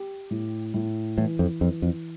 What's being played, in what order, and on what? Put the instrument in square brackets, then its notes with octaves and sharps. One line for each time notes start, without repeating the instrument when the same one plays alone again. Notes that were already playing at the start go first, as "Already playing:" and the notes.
Already playing: [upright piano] G4
A2
A2
[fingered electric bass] A2 [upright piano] E3
[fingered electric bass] F2
[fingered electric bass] F2 [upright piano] E3
[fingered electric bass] F2